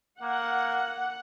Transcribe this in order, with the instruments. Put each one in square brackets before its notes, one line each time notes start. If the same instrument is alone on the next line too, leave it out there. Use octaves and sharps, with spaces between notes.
[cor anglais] A#3 [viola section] F#5